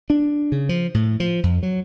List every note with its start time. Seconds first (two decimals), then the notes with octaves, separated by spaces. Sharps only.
0.10 D4
0.52 C#3
0.69 F3
0.94 A2
1.20 F3
1.43 F2
1.63 F#3